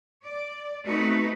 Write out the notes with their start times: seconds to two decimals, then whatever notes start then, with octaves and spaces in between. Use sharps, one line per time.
0.24 D5
0.86 A3 B3 C4 D#4 F#4 B4